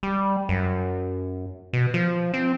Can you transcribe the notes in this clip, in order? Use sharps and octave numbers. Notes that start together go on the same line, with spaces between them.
G3
F#2
B2
F3
C4